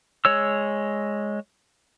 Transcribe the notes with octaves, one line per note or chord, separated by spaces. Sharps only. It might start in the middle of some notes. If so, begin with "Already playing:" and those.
G#3 C#5 E6